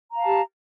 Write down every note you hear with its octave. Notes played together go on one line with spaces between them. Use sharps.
G4 F5 A5 A#5